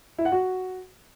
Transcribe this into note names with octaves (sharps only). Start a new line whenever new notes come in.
E4
F#5
F#4